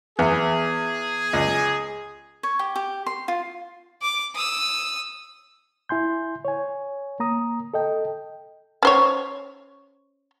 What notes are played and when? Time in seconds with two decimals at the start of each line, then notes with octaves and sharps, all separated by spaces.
0.19 E2 B3 G#4
1.33 C#2
2.43 C#5
2.59 G4
2.76 G4
3.06 C6
3.28 F4
4.01 D6
4.35 D#6 E6
5.89 E4 G#5 C6 G6
6.45 C#5 G#5
7.20 A#3 A#5 D#6
7.74 A4 D#5 G5
8.83 C#4 C5 C#5